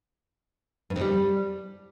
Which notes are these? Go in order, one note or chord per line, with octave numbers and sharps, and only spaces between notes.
G2
F2
G3